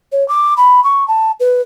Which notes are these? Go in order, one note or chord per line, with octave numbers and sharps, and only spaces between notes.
C#5
D6
B5
C#6
A5
B4